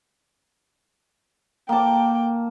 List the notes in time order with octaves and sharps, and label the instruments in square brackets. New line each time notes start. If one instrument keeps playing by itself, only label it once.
[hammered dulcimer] A#3 A5 [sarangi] G5